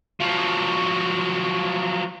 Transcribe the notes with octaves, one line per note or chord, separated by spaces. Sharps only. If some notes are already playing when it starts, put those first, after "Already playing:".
F3 F#3